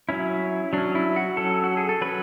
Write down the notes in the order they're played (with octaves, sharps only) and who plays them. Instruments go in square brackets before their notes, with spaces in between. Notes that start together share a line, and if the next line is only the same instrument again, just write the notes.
[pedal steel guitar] F#3 C#4 E4
F#3 C#4 D4
E4
F#4
F#3 C#4 A4
F#4
G#4
A4
F#3 C#4 B4